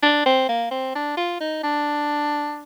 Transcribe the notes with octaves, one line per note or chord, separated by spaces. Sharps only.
D4
C4
A#3
C4
D4
F4
D#4
D4